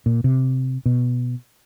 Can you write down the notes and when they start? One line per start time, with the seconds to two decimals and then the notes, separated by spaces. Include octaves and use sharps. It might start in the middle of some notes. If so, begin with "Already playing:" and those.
0.06 A#2
0.24 C3
0.86 B2